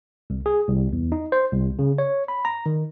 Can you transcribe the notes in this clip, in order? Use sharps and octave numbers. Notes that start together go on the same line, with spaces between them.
C2
G#4
C2
E2
D#4
C5
C2
C#3
C#5
B5
A#5
D#3